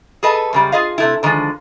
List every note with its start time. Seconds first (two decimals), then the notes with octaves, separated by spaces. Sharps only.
0.23 G#4 A4 B4 D#5 A5
0.53 F#2 C#3 G3
0.72 F4 G#4 D#5 F5
0.98 C3 A3 E4
1.23 D3 D#3 F3 G#3